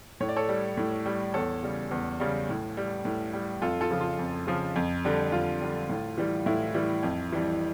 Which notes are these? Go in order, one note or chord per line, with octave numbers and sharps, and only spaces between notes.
A2 C#5
D5
A4 C#5
G3
A2
G3
E2 A4 C#5
C#3 G3
E2
C#3 G3
A2
G3
A2
G3
F2 F4 A4
F4 A4
C#3 F3
F4
F2
C#3 F3
F2
D3 G3
F2 F4
D3 G3
A2
E3 G3
A2 E4
E3 G3
F2
E3 G3